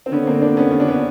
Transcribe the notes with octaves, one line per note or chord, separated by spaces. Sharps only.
C4
D3 B3 C#4
A#3 C4
C4 D4
B3 C#4
C#4
D4
B3 C#4